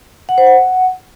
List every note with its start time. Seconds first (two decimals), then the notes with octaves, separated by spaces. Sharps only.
0.29 F#5
0.38 C5
0.47 F#5